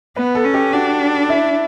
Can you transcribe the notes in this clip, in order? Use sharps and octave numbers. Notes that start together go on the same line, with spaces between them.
B3 B4
A4
C#4
G4
D4 F#4
E4